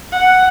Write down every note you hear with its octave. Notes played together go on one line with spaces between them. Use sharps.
F#5